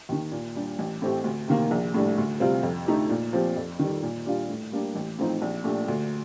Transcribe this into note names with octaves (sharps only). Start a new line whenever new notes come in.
D#2 D#3
A#2
G3 D4 G4
A1
A2 A3 C4 G4
D2
C3 D#3 A#3
A#1
A2 G3 D4
D2
C3 G3 C4 F4
F2
D3 A3 D#4 G4
A#2
F3 C4 G4
F2
D#3 G3
A#2
G3 D4 F4
A2
G3 A#3 D4 G4
A1
A2 F3 C4 D#4
A#1
A#2 A3 D4 G4
D2